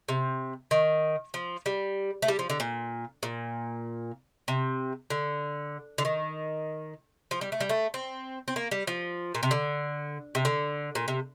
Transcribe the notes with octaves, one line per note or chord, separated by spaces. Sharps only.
C3
D#3
F3
G3
A3
G3
F3
D3
A#2
A#2
C3
D3
D3
D#3
F3
G3
A3
G3
A3
C4
C4
A#3
G3
F3
A#2
C3
D3
C3
D3
A#2
C3